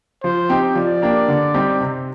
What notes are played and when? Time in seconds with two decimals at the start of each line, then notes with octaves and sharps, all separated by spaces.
0.23 F3 C5
0.49 C4 D#4 G4
0.75 F3 D5
1.02 A#3 D4 G4
1.28 D3
1.54 G3 C4 D#4 G4
1.81 C3